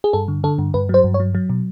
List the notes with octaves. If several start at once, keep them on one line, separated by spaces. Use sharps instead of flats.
G#4
G2 A4
D3
D3 A4
G2
G2 B4
F#3 C5
G2
C#5
F#3
F#3
B2